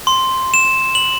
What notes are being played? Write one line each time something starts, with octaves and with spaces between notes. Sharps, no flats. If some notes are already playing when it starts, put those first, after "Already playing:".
C6
E7
F#7